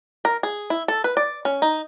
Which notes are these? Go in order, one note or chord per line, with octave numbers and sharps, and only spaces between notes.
A#4
G#4
E4
A4
B4
D5
C#4
D#4